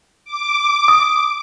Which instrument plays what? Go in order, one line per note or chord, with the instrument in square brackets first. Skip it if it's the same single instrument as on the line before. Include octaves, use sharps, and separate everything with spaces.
[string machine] D6
[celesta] D#6